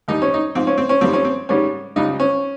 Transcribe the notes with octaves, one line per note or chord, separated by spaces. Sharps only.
D#2 D#3 G3 D#4
C#4
D#4
G#2 F3 C4
C#4
C4
C#4
F2 D#3 G3 C4
C#4
C4
G#2 D#3 G3 C#4
C#2 C#3 G3 D#4
C#4